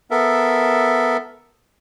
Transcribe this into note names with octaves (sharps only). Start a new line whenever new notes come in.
B3 A4 A#4 E5